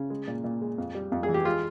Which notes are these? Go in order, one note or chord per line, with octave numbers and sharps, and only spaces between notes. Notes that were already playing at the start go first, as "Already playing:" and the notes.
Already playing: C#3
G#3
A#2
A#2
G#3
F2
G3
F2
G#4
E3
G4
G#3 F4